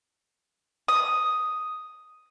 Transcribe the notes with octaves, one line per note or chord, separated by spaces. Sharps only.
D#6